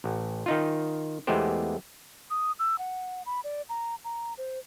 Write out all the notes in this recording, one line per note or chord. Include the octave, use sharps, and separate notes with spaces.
A1
D#3 D#4 F4
E2 G#3 A3 B3 G4 C5
D#6
E6
F#5
B5
D5
A#5
A#5
C5